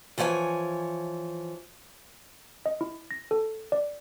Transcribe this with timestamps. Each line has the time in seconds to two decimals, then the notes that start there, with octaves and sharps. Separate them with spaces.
0.18 E3 F3 C#5 E5 G#5
2.66 D#5
2.81 E4
3.11 A#6
3.31 A4
3.72 D5